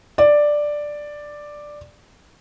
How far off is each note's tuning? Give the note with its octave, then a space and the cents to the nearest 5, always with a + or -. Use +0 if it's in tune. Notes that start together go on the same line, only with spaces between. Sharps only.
D5 +5